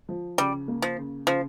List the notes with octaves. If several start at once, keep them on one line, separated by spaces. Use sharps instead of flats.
F3
C#3 G3
A#3
F3
C#3
C#3 F3